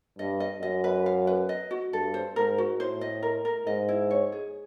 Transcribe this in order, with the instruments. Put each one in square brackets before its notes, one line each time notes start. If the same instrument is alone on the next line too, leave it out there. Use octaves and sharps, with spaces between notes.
[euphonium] G2 [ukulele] D#5
[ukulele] D#5
[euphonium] F#2 [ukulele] D#5
[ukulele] B4
F5
B4
D#5
F#4
[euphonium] G2 [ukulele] A4
[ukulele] C5
[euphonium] G#2 [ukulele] A#4
[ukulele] F#4
[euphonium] A2 [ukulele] C5
[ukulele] D#5
A#4
A#4
[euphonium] G#2 [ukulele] D#5
[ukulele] E4
C#5
G#4